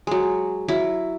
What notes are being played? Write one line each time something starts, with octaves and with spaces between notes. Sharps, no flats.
F#3 G#3
F#3 E4